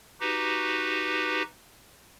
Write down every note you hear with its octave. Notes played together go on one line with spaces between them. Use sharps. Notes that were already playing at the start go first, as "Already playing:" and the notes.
D#4 F#4 G4 B4